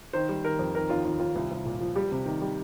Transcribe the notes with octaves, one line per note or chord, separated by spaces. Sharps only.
D#3 C5
G3
D#3 A#4
F2
D#3 A#4
D#2 F4
D#2 F4
D#2 F4
C2
C2
A#2
F3
G3 G4
C3
D#3
G3